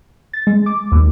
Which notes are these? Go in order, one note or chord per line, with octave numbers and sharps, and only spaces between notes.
A6
G#3
D6
D#2